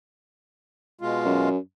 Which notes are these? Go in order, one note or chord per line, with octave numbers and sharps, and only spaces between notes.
B2 G#3 F4
F#2